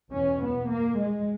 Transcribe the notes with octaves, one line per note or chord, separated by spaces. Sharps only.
E2 B2 C#4
B3
A#3
G#3